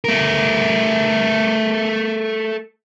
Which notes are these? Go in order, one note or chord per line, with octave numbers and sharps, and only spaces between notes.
A3 A#4